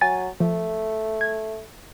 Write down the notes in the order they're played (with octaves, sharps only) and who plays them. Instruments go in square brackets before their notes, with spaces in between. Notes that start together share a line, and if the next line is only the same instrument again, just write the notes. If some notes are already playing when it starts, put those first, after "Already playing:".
[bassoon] F#3 [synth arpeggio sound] G#5 A6
[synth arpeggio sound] F3 [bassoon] A3
[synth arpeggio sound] G#6